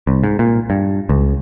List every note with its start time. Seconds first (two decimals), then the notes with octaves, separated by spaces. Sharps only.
0.07 C2
0.24 G#2
0.39 A#2
0.70 G2
1.09 C#2